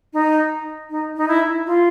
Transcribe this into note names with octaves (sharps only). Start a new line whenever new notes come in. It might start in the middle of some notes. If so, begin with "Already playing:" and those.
D#4
D#4
D#4
E4
F4